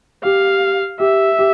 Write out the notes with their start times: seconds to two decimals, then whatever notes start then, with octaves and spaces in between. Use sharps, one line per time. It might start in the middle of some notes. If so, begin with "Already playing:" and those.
0.24 G4 F5
1.00 G4 E5
1.39 G4